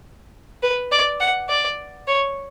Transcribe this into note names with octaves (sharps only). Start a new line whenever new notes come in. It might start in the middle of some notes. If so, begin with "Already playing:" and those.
B4
D5
F#5
D5
C#5